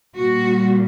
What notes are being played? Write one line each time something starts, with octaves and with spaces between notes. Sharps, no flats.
A#2 G3 F#4